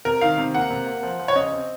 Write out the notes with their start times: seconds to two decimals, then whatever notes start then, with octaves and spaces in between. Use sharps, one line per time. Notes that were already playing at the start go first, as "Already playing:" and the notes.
0.05 C3 A#4
0.21 D#3 F5
0.38 C3
0.54 A#3 F#5
0.70 C3
0.87 A#3
1.03 F3
1.19 F3
1.28 C#5
1.35 C#3 D#5
1.52 C4